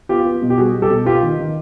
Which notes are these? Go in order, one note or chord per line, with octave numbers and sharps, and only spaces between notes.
B3 F4 G4
B3
B2
G4
G3 F#4 G#4
G3
G4 A4
B2
B3 F4 G4
D#3
D#3